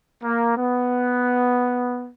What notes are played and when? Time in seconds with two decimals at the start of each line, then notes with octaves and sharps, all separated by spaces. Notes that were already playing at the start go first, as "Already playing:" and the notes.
0.23 A#3
0.57 B3